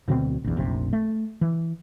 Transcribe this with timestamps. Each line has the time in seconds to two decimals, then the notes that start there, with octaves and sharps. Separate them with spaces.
0.08 D1 D2 B2 C4
0.44 A#1 E2
0.57 F1 A#1 C3
0.93 A3
1.41 E3